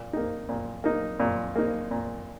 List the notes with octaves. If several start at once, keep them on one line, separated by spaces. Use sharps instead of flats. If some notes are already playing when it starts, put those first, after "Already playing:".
Already playing: A#2
A#3 D#4
A#2
A#3 D#4
A#2
A#3 D#4
A#2